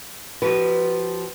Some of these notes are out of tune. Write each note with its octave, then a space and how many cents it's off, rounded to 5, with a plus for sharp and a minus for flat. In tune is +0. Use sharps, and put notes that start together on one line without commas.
F3 +0 F#4 +45 B4 +0